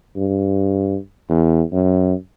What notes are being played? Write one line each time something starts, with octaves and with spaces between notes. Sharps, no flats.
G2
E2
F#2